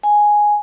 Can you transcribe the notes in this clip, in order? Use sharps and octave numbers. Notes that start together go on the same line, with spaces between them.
G#5